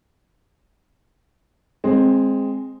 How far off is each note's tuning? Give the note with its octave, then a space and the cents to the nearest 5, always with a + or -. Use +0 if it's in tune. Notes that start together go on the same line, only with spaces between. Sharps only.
G#3 +0 C4 +15